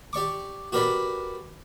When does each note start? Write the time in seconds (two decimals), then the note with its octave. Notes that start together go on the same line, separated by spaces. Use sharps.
0.13 G4 D5 C#6 D6
0.72 F#4 G4 A#4 B4 D5 B5